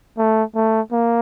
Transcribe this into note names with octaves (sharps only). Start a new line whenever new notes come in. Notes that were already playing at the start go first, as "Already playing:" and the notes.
A3
A3
A#3